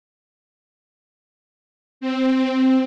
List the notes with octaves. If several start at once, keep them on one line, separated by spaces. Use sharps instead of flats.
C4